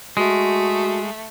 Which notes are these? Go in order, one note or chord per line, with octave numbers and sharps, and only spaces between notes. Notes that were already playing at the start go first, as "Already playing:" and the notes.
G#3 A3 F#4